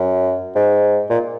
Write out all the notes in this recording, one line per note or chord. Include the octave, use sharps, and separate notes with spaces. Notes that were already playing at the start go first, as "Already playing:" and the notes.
Already playing: F#2
G#2
A#2